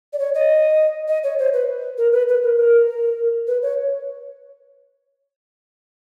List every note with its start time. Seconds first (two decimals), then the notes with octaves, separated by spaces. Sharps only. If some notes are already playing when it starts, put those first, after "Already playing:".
0.13 D5
0.19 C#5
0.35 D#5
1.08 D#5
1.24 C#5
1.39 C5
1.53 B4
1.98 A#4
2.12 B4
2.28 B4
2.43 A#4
2.58 A#4
3.47 B4
3.62 C#5